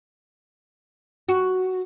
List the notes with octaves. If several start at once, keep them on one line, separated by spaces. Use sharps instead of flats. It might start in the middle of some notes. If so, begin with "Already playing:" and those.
F#4